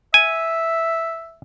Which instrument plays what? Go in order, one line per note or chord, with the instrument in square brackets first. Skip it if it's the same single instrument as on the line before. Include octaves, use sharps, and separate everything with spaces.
[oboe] E5 [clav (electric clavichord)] G#5